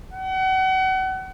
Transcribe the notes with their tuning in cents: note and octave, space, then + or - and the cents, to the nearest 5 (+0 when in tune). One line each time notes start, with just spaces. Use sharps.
F#5 +35